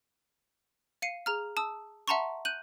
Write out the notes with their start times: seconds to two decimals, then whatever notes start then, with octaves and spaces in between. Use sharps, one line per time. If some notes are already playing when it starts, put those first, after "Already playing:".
1.02 F5 C7 C#7 D#7
1.26 G#4 A#5 F6
1.57 A5 D#6 E6
2.08 E5 F#5 A5 A#5 C6 C#6
2.45 F#6 G6 D#7 F#7